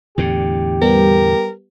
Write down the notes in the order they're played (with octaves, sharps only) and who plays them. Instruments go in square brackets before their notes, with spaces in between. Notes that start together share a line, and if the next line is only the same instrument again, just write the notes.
[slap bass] E2 A2 D3 [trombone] G4
[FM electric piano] G3 B3 [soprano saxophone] A#4